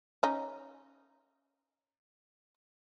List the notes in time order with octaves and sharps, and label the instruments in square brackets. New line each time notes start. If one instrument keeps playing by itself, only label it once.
[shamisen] C#4 D#4